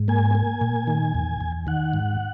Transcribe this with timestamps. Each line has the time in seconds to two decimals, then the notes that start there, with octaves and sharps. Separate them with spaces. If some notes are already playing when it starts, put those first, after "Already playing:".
Already playing: G#2
0.08 A#3 G#5
0.35 A#3
0.61 A#2
0.87 D#3
1.14 E2
1.41 E2
1.67 D#3 F#5
1.93 G#2